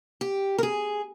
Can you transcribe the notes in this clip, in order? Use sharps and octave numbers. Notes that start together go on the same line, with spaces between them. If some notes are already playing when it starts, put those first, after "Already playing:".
G4
A#4
G#4